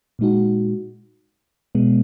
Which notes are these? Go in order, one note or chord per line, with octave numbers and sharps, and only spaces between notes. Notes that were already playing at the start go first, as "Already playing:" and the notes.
A#2 G#3 D#4 F#4
B2 G#3 B3